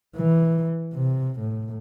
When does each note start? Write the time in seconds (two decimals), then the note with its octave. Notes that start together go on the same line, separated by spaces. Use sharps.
0.17 E3
0.94 C3
1.39 A2